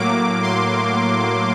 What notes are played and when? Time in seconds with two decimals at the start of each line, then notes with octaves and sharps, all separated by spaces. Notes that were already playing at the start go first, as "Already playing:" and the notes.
Already playing: A2 F#3 A#3 D6
0.43 C6